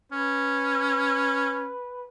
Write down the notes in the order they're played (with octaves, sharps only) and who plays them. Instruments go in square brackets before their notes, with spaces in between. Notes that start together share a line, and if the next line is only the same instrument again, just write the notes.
[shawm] C#4 [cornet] B4